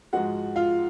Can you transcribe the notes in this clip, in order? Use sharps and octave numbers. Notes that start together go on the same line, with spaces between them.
G#2 F3 G#3 F#4 F#5
F4 F5